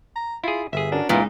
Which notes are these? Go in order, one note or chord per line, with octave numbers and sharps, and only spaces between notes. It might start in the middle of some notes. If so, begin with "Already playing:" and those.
A#5
E4 F4 G#4
G1 G#4 E5
C#4 D4 F#4 A#4
C#2 A#2 C#3 G#3 B3 D#4 E4